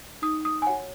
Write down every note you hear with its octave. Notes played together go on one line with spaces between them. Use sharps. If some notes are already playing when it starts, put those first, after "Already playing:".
D#4 D#6
D#6
G#5
F#4 C#5 F#5